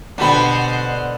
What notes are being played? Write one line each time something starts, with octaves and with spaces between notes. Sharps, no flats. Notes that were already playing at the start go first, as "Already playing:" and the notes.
B2 D3 B3 D4 G4 C5 D#5 B5